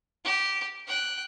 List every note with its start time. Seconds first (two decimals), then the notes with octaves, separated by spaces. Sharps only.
0.24 G4
0.87 G5 F#6